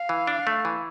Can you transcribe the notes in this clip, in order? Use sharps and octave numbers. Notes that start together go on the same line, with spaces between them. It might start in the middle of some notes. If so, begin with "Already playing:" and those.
Already playing: F5
E3
D4
A3
E3